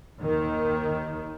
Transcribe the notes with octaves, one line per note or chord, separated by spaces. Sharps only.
D#2 D#3